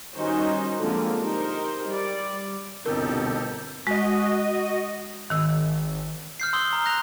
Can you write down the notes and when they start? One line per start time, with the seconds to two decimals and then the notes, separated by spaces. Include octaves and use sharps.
0.14 D#3 G3 C#4 D#4 F#4 C5
0.79 D3 F3 G#3 A#3 C4
1.19 D#4 G4 A#4 C5
1.90 G3 D5
2.86 G1 C2 B2 D#4 G4 A4 A#4
3.87 G#3 F#4 D#5
5.30 G#1 D#3 E6
6.40 F6 G6 C7
6.53 C6 D#6 E6 G7
6.73 A#5
6.86 F#6 A#6 F7